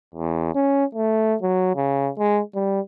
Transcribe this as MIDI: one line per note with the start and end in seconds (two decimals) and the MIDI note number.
0.14 0.53 40
0.55 0.84 61
0.95 1.35 57
1.42 1.71 54
1.76 2.10 49
2.19 2.40 56
2.55 2.80 55